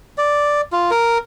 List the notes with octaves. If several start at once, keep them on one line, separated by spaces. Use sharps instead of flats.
D5
F4
A#4